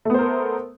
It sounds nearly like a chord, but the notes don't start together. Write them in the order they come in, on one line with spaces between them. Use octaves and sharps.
A3 B3 C5 A#4